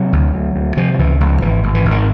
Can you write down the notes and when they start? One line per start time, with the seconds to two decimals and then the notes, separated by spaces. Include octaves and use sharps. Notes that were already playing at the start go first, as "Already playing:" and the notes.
Already playing: C3 F#3
0.13 D2
0.34 D2
0.56 D2
0.77 C3 F3
0.95 F3
0.99 C#2 E3
1.20 C#2 F3
1.42 G#1 E3
1.64 G#1
1.75 E3
1.85 G#1
1.91 D#3